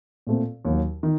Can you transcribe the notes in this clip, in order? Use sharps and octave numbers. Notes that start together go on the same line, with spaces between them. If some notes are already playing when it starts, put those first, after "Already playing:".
A#2 A3 C4
D#2 D#3 F#3
D#3